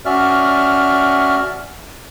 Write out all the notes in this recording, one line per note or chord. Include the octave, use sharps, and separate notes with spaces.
C#4 F#4 D5 E5 F6